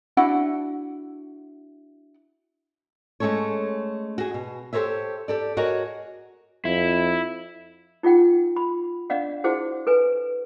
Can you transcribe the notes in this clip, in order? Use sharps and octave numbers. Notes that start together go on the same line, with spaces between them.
D4 E4 F#4 F#5
G#3 A3 C#4 A4 C#5
F#4 G#4
B2
G4 A4 A#4 C5 C#5 E5
G4 A4 D5
F#4 G#4 A#4 C#5 D#5 F#5
F2 E4
D#4 F4 G#4 F#5 G5
B5
D4 D5 D#5 F5 F#5
E4 F#4 G#4 C5 F#5
A4 B4 G#5